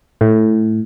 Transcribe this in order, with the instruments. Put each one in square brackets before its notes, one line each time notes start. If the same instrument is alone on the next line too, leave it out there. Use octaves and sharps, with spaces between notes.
[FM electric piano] A2